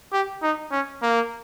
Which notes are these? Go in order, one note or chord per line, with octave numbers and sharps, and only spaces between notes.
G4
D#4
C#4
A#3